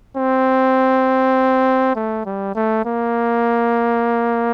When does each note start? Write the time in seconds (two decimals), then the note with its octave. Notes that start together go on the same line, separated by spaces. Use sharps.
0.16 C4
1.95 A3
2.25 G3
2.55 A3
2.85 A#3